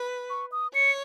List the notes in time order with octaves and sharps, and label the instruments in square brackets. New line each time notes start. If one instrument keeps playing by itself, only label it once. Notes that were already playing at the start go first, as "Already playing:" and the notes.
Already playing: [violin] B4
[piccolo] C#6
D#6
[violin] C#5 [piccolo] C#7